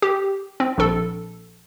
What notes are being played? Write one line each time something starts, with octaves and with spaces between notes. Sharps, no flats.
G4
C4
A#1 A4